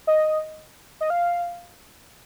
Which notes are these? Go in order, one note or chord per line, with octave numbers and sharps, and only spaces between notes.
D#5
D#5
F5